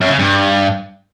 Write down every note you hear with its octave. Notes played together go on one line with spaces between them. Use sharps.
F#2
C#3
G2